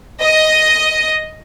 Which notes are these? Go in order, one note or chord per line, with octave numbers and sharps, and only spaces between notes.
D#5